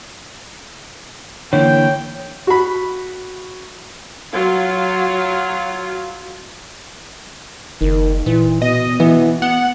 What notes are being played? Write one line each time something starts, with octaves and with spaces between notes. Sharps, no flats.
D3 E3 A#3 C#5 G5
F#4 B5
F#3 F4 F5
F#1 D#3
A#2 E3
B2 D#5
E3 B3
B3 F#5